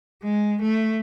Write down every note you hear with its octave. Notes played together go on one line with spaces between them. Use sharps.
G#3
A3